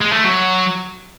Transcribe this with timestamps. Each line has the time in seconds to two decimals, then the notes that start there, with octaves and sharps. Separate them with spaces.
0.01 G#3
0.13 A3
0.24 F#3